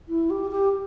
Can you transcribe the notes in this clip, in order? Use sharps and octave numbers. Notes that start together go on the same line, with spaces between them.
E4
G4
G4